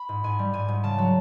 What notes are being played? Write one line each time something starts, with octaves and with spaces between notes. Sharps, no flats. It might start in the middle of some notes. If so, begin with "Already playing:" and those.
Already playing: B5
G#2
G#2 G#5
G3
G#2 G#5
G#2
C#3 A5
F#3